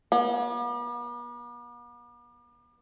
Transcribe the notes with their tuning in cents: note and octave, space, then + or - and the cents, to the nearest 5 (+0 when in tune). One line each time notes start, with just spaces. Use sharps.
B3 -45